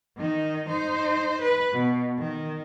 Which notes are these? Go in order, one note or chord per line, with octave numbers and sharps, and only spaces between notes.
D#3 D#4
D#4 C5
B4
B2
D#3